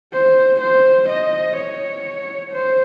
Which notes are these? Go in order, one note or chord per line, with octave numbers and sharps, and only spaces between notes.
C5
C5
D#5
C#5
C5